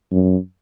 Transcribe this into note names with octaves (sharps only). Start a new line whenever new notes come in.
F#2